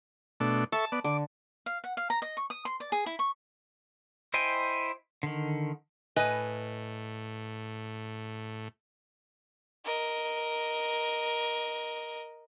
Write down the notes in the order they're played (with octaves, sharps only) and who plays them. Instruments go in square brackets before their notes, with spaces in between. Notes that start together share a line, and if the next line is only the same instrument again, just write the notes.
[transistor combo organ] B2 A3 D4
[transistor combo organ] A4 E5 C#6 [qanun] A5
[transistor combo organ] B3 D5
[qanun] D3 [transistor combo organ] D6
[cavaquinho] F5
F#5
F5
A#5
D#5
C#6
D#6
C6
D5
G#4
E4
C#6
[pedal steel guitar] E4 C5 D#5 G5 G#5
D3 D#3
[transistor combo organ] A2 [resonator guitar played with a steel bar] B4 D#5 G#5
[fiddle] A#4 D#5